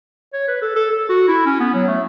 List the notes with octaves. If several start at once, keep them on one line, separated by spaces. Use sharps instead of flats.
C#5
B4
A4
A4
A4
F#4
E4
C#4
B3
F#3
A3